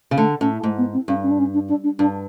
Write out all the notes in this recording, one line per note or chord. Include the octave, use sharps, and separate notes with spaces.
C#3
D3 A3
A2 C#4
G#2 A3
B3
C4
G2 C#4
C#4
D4
C#4
D4
D4
D4
G2 D4